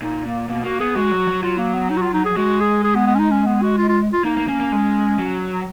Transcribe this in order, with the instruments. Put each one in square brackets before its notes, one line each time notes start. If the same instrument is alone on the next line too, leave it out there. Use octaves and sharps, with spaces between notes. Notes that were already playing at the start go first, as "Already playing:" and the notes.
[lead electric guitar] A#2 [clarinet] D#4
[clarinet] A#3
[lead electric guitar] B2 [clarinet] A#3
[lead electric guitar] A#3 [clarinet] F#4
[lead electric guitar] B3 [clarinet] G#4
[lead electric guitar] G#3 [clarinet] F#4
[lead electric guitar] F#3
F#3
[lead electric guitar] F#3 [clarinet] F4
[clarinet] A#3
B3
D#4
F#4
F4
D#4
G#4
[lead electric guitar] G#3 [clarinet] F#4
[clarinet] G#4
G#4
B3
B3
C#4
D#4
C#4
B3
F#4
F4
F4
F4
[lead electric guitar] A#3 [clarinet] D#4
[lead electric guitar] A#3
[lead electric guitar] A#3 [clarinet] C#4
[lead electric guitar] A#3
G#3
F#3